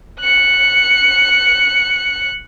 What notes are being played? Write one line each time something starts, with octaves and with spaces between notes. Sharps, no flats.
F#6 C#7